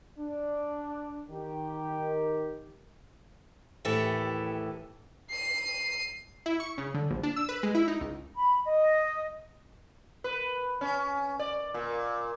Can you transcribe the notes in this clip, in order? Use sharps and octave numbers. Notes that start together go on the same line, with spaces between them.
D4
D#3 G4
D#2 A2 E3 G4 A4 E5
C7 D#7
E4
C#6
C#3
D3
A#1
D4
E6
B4
G#3
E4
D#4
C#2
B5
D#5
B4
C#4
D5
A#2